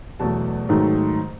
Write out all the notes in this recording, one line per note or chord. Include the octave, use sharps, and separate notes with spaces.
E2 B2 F#3 A3 A5
G#2 D#3 F#3 A3